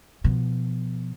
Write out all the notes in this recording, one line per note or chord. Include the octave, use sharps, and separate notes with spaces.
B2 F3